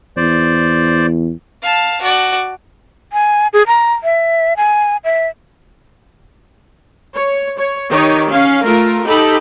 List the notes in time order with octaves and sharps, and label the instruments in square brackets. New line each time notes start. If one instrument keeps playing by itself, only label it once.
[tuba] E2 [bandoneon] C5 D5
[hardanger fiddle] F5 A5
F#4 D5
[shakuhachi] G#5
G#4
A#5
E5
G#5
E5
[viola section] C#5
C#5
D#3 D#4 G4 C#5
C#4 F5
A3 F4 A#4
D#4 G4 A4 B5